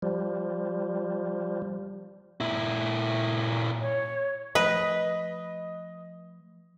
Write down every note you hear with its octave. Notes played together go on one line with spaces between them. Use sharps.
F3 G3
A#2 E4
C#5
F3 A3 B4 D#5